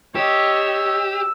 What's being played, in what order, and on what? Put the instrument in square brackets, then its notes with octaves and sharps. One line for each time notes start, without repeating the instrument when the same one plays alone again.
[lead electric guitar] G4 [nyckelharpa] C#5 D#5 [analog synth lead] E6